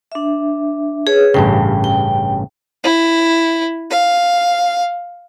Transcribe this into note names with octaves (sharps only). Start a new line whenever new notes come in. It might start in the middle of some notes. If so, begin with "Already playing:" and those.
D4 E5
G#4 B4 C#5
A1 G2 C#3 G5
G5
E4
F5